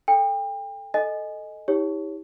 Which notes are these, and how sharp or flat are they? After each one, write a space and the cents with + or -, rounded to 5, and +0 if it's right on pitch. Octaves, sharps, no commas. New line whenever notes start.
A4 +0 G5 +35
A4 +0 D#5 +0 G#5 +0
E4 -40 G4 +25 C#5 +0